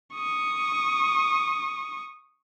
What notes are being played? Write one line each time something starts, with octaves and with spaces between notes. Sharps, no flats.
C#6 D#6